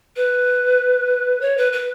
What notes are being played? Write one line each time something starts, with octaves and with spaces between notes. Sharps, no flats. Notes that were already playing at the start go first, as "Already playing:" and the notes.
B4
C#5
B4
B4